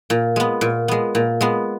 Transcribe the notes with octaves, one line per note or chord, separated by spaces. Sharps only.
A#2
G#3 B3
A#2
G#3 B3
A#2
G#3 B3